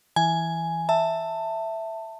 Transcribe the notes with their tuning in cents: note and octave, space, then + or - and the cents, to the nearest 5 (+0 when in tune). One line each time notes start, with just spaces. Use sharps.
E3 +0 G#5 +5
E5 +0 A5 +20